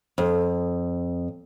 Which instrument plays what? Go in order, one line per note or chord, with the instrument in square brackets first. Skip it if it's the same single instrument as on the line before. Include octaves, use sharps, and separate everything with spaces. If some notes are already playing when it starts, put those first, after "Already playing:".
[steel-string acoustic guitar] F2